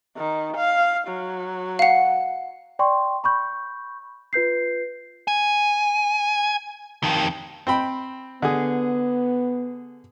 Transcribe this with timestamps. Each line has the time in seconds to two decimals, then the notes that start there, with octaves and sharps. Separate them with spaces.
0.17 D#3
0.57 F5
1.08 F#3
1.79 F5 F#5
2.79 D5 G5 C6 C#6
3.24 B5 C#6 G6
4.33 F4 B4 G6 C7
5.28 G#5
7.03 F2 D#3
7.67 C4 G5 B5
8.42 D3 B3 G#4